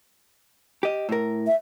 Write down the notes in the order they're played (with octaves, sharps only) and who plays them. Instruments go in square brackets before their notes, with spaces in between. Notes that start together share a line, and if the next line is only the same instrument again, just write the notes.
[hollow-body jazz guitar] G4 D#5
A2 A#4
[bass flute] E5